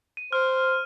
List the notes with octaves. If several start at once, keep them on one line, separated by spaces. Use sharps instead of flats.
D#7
C5 F6